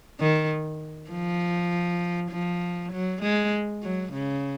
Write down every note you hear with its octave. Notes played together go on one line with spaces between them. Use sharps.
D#3
F3
F3
F#3
G#3
F#3
C#3